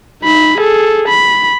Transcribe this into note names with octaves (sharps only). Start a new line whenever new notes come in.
D#4 B5
G#4 A4
B5